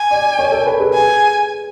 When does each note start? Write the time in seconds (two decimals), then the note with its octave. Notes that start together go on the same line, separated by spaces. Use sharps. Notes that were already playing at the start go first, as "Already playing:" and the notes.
Already playing: G#5
0.11 D5
0.39 C#5
0.52 A4
0.66 B4
0.80 G#4
0.94 G#4 G#5